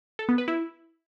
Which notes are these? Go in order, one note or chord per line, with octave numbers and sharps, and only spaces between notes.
A4
B3
B4
E4